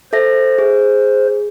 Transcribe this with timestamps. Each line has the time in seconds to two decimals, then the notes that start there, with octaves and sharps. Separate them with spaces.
0.13 A4 C5 E5 A#6
0.58 G#4